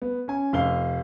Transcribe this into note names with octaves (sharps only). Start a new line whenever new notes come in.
B3
C#4 G#5
F1 F5 G7